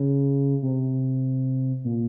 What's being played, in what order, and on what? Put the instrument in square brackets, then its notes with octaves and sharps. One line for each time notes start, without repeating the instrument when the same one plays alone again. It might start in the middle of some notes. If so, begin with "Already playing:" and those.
Already playing: [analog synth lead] C#3
C3
A#2